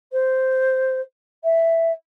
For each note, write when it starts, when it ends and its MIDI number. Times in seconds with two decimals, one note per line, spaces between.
0.12 1.00 72
1.43 1.91 76